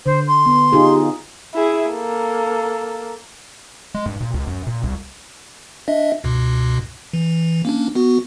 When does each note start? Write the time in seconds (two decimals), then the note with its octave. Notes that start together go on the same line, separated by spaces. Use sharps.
0.06 D3 C5
0.27 C6
0.46 B3
0.73 D#4 F4 G4 G#4
1.54 E4 G#4
1.90 A#3 A4
3.95 G#3
4.06 G2
4.21 A#2
4.34 C#2
4.47 F#2
4.67 A#2
4.84 C2
5.88 D4 D#5 E5
6.24 C#2 G2 B2
7.13 E3
7.65 A#3 C#4 D4
7.95 B3 F#4